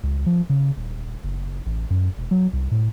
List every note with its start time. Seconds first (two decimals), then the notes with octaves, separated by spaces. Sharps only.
0.03 C#2
0.26 F3
0.49 C#3
0.76 D#1
1.23 F#1
1.66 A1
1.90 F#2
2.18 E1
2.31 F#3
2.53 C2
2.71 A2